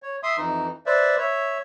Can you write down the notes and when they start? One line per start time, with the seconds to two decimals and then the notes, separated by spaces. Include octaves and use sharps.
0.03 C#5
0.23 E5 C6 D#6
0.38 F2 E3 D#4
0.86 B4 C5 D5 E5
1.18 C#5 E5